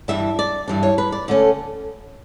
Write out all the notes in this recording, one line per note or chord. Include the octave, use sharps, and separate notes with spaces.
G2 E3 G3 D4 E5
D5
G2 E3 G3 D4
C#5
B4
D5
D3 A3 C#4 D5